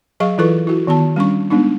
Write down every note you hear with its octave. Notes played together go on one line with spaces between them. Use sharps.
F#3 G#4 D#5 F5 C#6
E3 E4 F4 A4 B4 C#6
E4 F#4
D#3 B3 F#4 A5
G3 C#4 D4 C#6
G#3 B3 D4 D#4